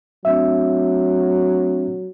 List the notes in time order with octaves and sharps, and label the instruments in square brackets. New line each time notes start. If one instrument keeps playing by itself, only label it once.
[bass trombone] F#3 [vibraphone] A3 C4 D4 [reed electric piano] E5